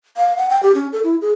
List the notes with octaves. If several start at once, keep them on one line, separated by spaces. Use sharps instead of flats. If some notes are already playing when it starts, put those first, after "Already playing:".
F5
F#5
G5
G4
C#4
A4
E4
G#4